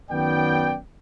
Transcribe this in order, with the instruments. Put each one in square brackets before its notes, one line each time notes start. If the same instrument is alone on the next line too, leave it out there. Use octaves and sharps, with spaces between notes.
[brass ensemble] F#2 D#3 F#3 B3 D5 G5